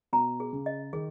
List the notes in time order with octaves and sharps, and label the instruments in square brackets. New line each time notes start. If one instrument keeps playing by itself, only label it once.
[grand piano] B2 [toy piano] A#5
[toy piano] G#4
[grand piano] C#3
[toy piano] D#5
[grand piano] D#3 [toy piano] G#4